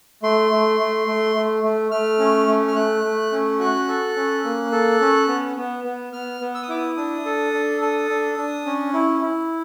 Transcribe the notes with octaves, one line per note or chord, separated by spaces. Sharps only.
A3 C6
A3
A3
A3
A3
A3
A3 F6
C#4
A3
F6
A3 F#6
A3
C#4
F#4 F#6
A4
C#4
A#3
A4
C#4
B3
B3
B3
B3 F6
B3
E6
D#6
E4 D6
D#6
D4 D#6
A4
D4
A4
D4
D4
C#4
E4
E4